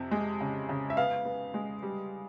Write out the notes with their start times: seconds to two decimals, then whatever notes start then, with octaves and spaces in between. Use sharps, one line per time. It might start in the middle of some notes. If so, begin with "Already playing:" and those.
Already playing: F2 C3
0.11 G#3
0.41 C#3
0.69 C#3
0.90 E5
0.97 B3 F5
1.25 B3
1.54 G#3
1.83 G3